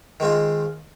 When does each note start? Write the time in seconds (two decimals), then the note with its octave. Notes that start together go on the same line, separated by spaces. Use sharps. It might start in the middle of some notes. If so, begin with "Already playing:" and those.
0.20 D#3 G#3 C4 F4